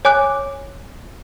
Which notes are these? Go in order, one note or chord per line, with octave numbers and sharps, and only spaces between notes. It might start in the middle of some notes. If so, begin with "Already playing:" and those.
C#5 G#5 D6 F#6